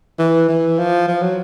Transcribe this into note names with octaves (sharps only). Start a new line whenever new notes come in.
E3
E3
F3
F3
F#3